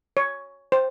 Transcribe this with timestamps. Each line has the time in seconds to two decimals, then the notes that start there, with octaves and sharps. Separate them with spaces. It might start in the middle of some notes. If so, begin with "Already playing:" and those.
0.17 C#5
0.72 C5